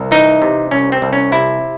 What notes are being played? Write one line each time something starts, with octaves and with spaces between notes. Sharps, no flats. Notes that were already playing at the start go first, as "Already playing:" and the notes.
Already playing: C2
E3 D#4
C3
C2 C#4
C4
C2
C#4
C3 E4